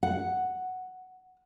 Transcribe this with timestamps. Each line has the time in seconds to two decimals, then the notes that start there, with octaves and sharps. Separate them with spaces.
0.03 F#5